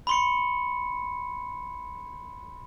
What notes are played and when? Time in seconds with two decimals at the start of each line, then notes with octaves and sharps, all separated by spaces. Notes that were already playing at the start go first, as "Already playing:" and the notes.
0.07 B5 C6 C#7